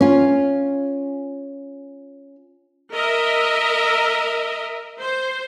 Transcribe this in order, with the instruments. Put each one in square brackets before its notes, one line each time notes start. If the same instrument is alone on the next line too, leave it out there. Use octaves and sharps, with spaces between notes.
[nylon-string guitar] C#4 F4
[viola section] A#4 D#5 E5
C5